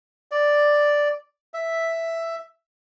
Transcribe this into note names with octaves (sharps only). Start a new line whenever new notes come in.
D5
E5